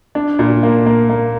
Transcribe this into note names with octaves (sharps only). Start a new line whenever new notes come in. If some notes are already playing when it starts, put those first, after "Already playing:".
D4
A#2
A#3
A#3
A#3